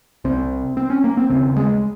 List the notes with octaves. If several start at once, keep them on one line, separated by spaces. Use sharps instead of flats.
C2 C3 C4
C4
C#4
A#3
C4
D#2 C#3 C4
G#3